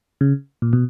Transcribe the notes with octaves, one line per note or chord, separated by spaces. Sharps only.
C#3
A#2
B2